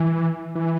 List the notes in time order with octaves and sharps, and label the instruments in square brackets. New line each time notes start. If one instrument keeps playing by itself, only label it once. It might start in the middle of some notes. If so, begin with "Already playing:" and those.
Already playing: [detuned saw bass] E3
E3